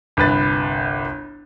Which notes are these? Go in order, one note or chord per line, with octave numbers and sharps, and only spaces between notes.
G1 C2 B4 A6